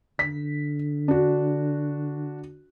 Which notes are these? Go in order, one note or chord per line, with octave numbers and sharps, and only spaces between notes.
D3 B6
D4 F#4